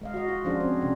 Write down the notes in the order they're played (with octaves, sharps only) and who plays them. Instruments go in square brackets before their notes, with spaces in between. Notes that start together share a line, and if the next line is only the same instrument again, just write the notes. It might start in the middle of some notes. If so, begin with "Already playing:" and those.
[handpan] G#3 D#5 F5
F#4 D#5
F4
F3 C#4 D4 F4 G#4
C4
C3 C#4 D4